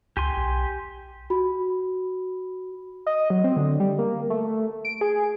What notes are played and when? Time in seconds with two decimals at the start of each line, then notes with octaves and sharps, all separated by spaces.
0.17 C#2 G4 G#5 C6
0.37 B1
1.30 F#4 B5
3.06 D#5
3.30 F#3
3.44 C4
3.57 D3
3.80 G3
3.99 A#3
4.30 A3
4.85 D7
5.01 G#4